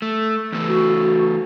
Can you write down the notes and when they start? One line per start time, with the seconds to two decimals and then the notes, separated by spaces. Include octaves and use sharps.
0.02 A3
0.52 E2 A3
0.68 F#4